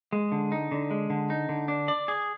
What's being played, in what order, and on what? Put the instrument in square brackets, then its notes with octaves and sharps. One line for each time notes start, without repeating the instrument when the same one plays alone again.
[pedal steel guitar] G#3
D3
D#4
D3
G#3
D3
D#4
D3
D4
D5
G#4